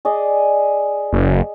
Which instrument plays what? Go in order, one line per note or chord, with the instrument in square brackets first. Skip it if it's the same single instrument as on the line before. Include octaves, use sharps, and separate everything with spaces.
[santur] G#4 D5 D#5
[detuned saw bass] F#1